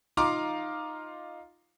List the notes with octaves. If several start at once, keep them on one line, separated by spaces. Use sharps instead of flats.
D#4 F4 F5 A#5 C6 D6